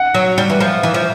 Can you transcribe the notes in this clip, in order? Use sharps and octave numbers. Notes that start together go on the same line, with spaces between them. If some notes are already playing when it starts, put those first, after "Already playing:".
Already playing: F#5
F#3
G3
E3
F3
E3
F3